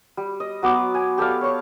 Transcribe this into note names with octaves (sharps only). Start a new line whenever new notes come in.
G3
D#5
F#3 B3 D6
G#5
G4 A4 D5 F5
C#5 C#6